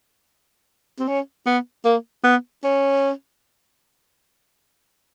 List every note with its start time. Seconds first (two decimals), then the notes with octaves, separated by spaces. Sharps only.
0.99 C4
1.08 C#4
1.46 B3
1.85 A#3
2.24 B3
2.64 C#4